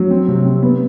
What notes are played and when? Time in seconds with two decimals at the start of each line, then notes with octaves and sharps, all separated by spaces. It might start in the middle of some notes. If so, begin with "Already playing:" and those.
Already playing: F#3
0.10 C4
0.28 C3
0.46 C4
0.63 B3